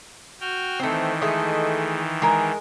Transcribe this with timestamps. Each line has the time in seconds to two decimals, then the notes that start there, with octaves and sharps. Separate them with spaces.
0.41 F#4 G5 F6
0.80 D#3 E3 A3 C4
1.22 G#3 A3 D#5
2.22 G#3 A#4